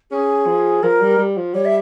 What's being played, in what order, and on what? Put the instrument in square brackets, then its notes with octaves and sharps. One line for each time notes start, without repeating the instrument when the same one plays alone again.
[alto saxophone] C#4 [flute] G#4
[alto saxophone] F3
[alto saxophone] F3 [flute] A#4
[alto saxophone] G3
G3
F3
[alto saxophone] G3 [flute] C#5
[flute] E5